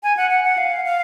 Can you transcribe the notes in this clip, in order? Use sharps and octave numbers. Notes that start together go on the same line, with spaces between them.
G#5
F#5
F#5
F#5
F5
F5